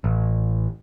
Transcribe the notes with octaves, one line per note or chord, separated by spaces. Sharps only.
A1